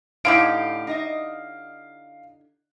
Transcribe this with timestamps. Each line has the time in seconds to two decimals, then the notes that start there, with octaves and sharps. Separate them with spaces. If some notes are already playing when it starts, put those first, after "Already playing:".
0.25 A2 D3 D#4 E4 G4 F5 D7
0.87 D#4 D#5 E5